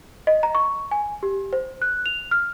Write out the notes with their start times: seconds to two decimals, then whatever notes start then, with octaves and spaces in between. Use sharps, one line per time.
0.27 D#5
0.43 A#5
0.55 C#6
0.91 G#5
1.23 G4
1.53 C5
1.82 F#6
2.06 F7
2.31 F6